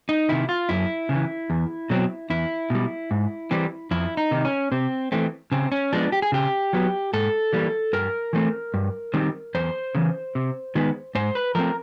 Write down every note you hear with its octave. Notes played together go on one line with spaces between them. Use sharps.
D#4
C3 D#3 E4
F4
F#2 E4
C#3
E3
E2
B2 F#3 A3 C4
E2 E4
B2 G3
G#2
E3 G3 C4
F2 E4
D#4
C3 D#3
C#4
C3 C4
E3 A3 C4
C#3 C4
C#4
F3 G#3 B3 D4
G4
G#4
C#3 G4
F#3 B3
G#2 A4
E3 G3 A#3
G2 A#4
E3 A3 C4
G2
D#3 G3 C4
E2 C5
C#3 E3
C3
D#3 G#3 B3
G#2 C5
B4
F3 A3 C4 A#4